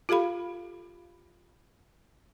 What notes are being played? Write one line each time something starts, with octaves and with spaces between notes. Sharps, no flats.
F4 G4 A4 F5 B5